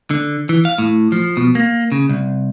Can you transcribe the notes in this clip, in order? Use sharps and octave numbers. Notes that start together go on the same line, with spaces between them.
D3
E3
F5
A2
F3
B2
A#3
C#3
C2